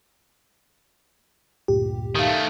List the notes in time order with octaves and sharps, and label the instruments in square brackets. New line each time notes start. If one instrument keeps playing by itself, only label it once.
[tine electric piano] D2 G2 A#2 [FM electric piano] G4
[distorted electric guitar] D#3 A3 [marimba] D#4 F5